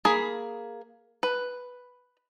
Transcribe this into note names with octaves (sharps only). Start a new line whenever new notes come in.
A#3 G#4 B5
B4